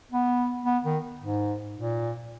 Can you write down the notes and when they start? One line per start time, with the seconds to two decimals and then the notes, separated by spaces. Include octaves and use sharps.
0.12 B3
0.66 B3
0.85 D#3
1.21 G#2
1.76 A#2